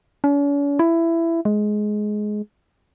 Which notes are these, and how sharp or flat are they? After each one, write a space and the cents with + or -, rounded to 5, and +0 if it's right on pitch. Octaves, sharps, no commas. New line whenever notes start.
C#4 +45
E4 +15
G#3 +15